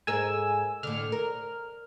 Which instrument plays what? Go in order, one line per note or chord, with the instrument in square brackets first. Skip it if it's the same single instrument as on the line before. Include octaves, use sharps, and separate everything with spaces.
[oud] G#2 G#4 A#4 [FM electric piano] G#5 E6
[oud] A2 D3 [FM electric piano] F6
[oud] A#4